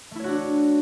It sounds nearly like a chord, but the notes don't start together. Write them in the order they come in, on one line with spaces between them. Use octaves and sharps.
A3 E4 C#5 F#4 D4